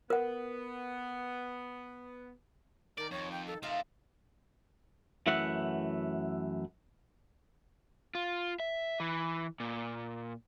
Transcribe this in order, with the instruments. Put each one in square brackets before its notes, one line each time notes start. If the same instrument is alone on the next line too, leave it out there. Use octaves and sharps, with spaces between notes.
[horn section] B3 [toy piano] A#4 F#5
[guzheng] D#3 A5 [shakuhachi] A#4 [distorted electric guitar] D5
[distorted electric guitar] F2 [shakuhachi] C#5
[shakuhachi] G5
A4
[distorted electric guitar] C3 A3 [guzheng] F4 F5 A#5 [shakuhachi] D#5
[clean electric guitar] F#2 E3 A3 E4 E5 F#5
[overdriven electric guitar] F4
E5
E3
A#2